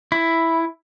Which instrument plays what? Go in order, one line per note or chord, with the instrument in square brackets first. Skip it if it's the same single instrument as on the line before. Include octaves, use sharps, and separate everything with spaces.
[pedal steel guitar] E4